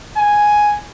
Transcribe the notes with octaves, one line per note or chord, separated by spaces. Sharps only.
G#5